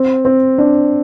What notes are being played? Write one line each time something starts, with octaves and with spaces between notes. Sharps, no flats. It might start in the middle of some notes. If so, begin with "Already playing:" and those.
Already playing: C4
C4
D4